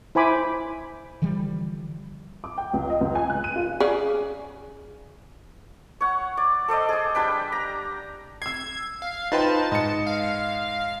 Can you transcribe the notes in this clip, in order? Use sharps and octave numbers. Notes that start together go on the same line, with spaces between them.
E4 C5 G#5 B5 D6
D3 E3 F3 G3
D6
G5
C#2
D#5
C#2
G#5
F#6
D#7
F4
C#3 G#4 D5
C#5 F#5
D5
A4 C5 D5 D#5
G#4 C5
G3 D4 B4 G5
A#5
E6 G#6 C7
F5
D#4 F4 B4 C5 G5 A5
G#2 D#5 C#7
F5